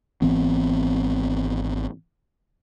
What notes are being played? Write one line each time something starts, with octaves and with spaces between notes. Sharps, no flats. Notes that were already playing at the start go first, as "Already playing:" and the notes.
G#1 E3 B3 C4